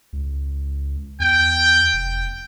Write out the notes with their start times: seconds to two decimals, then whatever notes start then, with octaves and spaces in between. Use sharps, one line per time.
0.13 C#2
1.20 E2 G5
1.93 F1